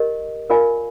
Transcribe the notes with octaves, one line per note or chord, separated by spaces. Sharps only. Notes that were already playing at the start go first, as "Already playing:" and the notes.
Already playing: G4 A#4 D#5
F4 A#4 D5 F5 G#5